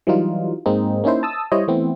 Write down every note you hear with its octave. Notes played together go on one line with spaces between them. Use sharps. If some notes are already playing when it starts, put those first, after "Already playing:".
E3 F#3 G3 D#4 F4
G#2 G#3 A#3 C4 D#4
A#3 C#4 D#4 E4 C5
A5 D#6 E6
G3 E4 C5 C#5 D#5
E3 A3 B3 C4 E4